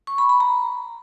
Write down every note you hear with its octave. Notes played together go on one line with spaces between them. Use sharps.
C#6
B5
B5
A#5